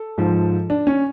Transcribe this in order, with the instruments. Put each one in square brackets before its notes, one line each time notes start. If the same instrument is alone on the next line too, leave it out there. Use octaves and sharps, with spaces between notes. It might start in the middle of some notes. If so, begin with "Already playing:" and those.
Already playing: [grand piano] A4
G#2 F3
D4
C#4